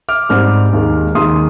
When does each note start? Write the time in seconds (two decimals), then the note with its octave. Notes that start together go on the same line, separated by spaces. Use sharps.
0.09 D6 F6
0.29 G#2 G3 C4 D6 F6
0.73 D#2 D#3 G#3
1.15 D#2 D#3 G#3 C6 D#6